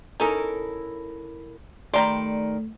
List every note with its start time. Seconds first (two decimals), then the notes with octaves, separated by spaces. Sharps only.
0.20 C#4 D#4 E4 A4 A#4
1.94 D#3 G3 A3 D5 A#5 C6